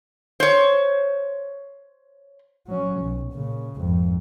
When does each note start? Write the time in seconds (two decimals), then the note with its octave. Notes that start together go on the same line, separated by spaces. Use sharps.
0.40 C5 C#5
2.67 F#3 C#4
3.01 B1
3.32 A#2 C#3
3.77 G#1 F2